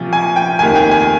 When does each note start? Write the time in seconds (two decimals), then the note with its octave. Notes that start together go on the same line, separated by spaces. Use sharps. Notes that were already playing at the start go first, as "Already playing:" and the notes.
Already playing: C2 A#2 F3
0.13 G#5
0.36 G5
0.59 F1 D#2 D#3 G#5
0.75 G5
0.91 G#5